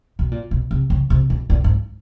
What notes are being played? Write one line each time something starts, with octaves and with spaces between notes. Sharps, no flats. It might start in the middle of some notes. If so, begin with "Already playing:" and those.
B2
A#2
B2
C3
C#3
C3
B2
A#2
G#2